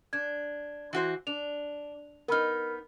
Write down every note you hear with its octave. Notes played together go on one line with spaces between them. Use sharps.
D4 G#6
E3 F#4 C5
D4 F7
B3 D#4 A#4 B5 F6